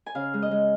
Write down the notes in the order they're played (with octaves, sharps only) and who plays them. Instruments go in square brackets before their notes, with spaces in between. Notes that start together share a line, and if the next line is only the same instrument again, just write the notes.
[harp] G#5
C#3 F5
G#3
D#5
G#3